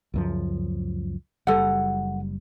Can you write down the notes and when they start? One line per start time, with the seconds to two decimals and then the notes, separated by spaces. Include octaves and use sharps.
0.14 C#2 F#2 F3
1.47 F#1 G3 A4 F#5